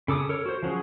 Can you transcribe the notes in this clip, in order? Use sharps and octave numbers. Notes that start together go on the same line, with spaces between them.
C#3 A4 D6 D#6
A4 A#4 C#5
F#4 C5
F3 F#3 C#4 G#4